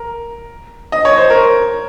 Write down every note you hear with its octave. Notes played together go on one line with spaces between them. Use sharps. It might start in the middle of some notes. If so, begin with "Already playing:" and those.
Already playing: A#4
D#5
C#5
C5
A#4